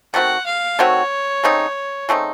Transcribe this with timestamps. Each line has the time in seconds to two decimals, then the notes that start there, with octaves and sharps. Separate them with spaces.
0.14 D#3 A3 C4 F#4 F#5
0.46 F5
0.79 D#3 A3 C4 F#4 C#5
1.44 C#3 A3 C4 D#4
2.09 C#3 A3 C4 D#4